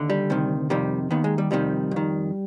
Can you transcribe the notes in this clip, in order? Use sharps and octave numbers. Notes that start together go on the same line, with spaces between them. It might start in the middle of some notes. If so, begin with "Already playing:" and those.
Already playing: D#2 D3
G3
D2 C3 D#3
F2 C3 D#3 G3
D#2 D#3 B3
G#3
G3
F2 C3 D#3 G3
F2 D#3